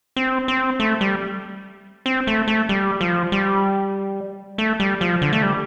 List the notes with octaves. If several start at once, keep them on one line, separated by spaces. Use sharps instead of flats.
C4
C4
A3
G3
C4
A3
A3
G3
F3
G3
A3
G3
F3
D3
A3
G3